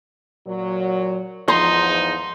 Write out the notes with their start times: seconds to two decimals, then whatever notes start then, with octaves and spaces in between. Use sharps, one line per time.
0.47 A#2 F#3
1.48 E2 G#2 F3 D#4 C6